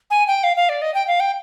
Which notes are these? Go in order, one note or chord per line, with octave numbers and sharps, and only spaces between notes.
G#5
G5
F5
F5
D5
D#5
G5
F5
G5